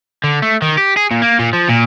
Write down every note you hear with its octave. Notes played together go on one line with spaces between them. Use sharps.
D3
A3
D#3
G4
G#4
A#2
A#3
A#2
F3
A#2